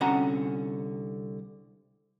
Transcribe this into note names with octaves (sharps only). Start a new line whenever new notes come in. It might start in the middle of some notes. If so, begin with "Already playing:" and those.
C2 D3 C#4 F#4 F#5 A#5